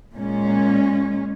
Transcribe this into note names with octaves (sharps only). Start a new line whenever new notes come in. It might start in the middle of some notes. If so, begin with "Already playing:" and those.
A#2 G#3 C#4